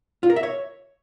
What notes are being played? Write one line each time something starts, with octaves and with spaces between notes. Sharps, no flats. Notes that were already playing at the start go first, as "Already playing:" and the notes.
F4
A#4
E5
C#5